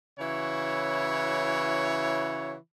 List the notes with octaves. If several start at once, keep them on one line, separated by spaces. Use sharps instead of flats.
C#3 E3 E4 F#4 C#5